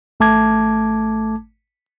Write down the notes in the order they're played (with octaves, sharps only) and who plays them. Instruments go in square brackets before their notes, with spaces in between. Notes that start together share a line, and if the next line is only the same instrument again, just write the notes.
[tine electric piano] G#1 A3 A5 D6 G#6